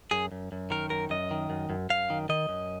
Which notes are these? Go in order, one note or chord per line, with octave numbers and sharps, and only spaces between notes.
F#2 G#4
F#2
F#2
D#3 A#4
F#2 A#4
F#2 D#5
D#3
F#2
F#2
F#2 F5
D#3
D#3 D#5
F#2